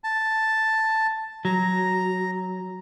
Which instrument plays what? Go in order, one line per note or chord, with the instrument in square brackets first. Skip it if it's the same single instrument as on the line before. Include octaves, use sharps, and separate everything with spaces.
[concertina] A5
[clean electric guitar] F#3 [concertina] A#5